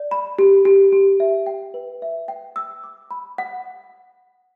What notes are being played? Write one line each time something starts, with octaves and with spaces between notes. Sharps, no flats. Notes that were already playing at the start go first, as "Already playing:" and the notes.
Already playing: D5
B5
G4
G4
G4
E5
G5
B4
E5
G5
E6
D6
B5
F#5